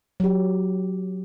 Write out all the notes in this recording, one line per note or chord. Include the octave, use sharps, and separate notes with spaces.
F#3 G4